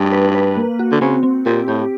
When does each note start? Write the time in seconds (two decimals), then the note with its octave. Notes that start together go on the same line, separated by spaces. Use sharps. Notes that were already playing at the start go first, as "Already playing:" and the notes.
Already playing: G2
0.12 B4
0.35 B4
0.57 A#3
0.79 F#4
0.91 D3
1.01 C#3 C4
1.23 C4
1.46 A#2 G4
1.68 A2 G4